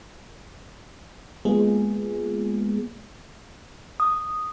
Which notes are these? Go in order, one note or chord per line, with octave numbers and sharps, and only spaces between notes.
G#3 A#3 B3 F4 G#4
D#6